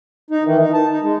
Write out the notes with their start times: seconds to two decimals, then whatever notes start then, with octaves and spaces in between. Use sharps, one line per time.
0.30 D#4
0.43 D#3 E3
0.59 D#4
0.73 A5
0.90 D#4
1.02 G#3